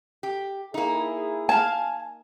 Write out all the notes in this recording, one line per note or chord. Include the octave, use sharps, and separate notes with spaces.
G4
A#3 D#4 E4 G#4
F5 G#5 A5